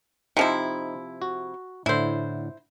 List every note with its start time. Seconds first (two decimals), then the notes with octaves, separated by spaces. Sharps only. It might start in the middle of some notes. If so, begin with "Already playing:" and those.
0.37 C3 F3 D#4 E4 D#5
1.22 F#4
1.86 A2 D3 E4 C5